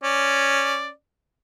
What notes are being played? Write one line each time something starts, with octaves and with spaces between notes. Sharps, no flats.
C#4 D5